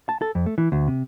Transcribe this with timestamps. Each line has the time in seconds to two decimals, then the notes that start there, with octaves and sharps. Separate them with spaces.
0.09 A5
0.22 A4
0.35 F2
0.46 A3
0.58 E3
0.72 D2
0.88 C3